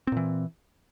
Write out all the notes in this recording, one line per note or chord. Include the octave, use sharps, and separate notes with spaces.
A#2 E3 C4